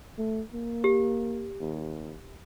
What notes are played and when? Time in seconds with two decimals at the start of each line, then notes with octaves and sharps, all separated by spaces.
0.18 A3
0.53 A#3
0.84 G4
1.61 D#2